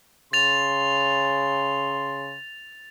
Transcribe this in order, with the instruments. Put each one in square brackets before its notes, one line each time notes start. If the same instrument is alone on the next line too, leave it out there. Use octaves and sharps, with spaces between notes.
[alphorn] C#3 [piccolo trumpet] C6 [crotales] A6 F7